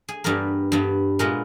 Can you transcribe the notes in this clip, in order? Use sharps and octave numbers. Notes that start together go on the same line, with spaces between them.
G#4
G2 G3 B3 A#4
G2 G3 B3
A#2 G#3 B3 A#4